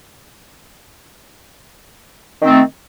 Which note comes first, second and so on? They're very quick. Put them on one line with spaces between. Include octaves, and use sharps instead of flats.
D#3 C4 A3